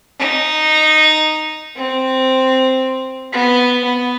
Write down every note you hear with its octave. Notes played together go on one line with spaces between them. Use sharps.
D#4
C4
B3
B3